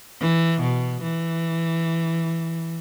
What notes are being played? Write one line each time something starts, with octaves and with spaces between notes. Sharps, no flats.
E3
B2
E3